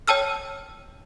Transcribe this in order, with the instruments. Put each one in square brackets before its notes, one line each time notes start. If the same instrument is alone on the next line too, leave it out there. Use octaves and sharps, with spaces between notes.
[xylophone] C#5 G5 A5 E6 F6